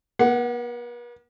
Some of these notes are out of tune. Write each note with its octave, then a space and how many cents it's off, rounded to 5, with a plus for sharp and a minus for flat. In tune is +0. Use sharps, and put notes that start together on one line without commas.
B3 -45 F#5 +5